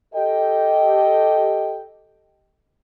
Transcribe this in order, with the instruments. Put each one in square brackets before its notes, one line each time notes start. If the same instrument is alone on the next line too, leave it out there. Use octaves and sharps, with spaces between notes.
[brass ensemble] G4 A4 D#5 G5